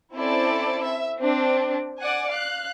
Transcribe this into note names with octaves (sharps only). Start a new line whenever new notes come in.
C4 C#4 E4 A4 C5 D5
E5
C4 D4
D5 F#5 G#5
F5 F#6